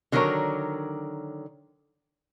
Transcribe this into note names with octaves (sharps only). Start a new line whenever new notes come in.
D3 D#3 F#3 B3 A#4 C#5